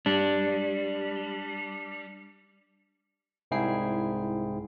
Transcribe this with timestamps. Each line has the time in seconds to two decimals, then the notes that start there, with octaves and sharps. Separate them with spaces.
0.06 G3 D4
3.51 C2 G#2 E4 G#4 G5 C7